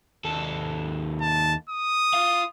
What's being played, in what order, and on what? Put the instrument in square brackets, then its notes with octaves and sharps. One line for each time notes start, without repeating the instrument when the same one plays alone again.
[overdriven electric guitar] D#2 A4
[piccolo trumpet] A5
D#6
[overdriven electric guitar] F4 F5